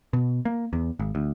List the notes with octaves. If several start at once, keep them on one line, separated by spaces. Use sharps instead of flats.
B2
A#3
E2
G#1
D2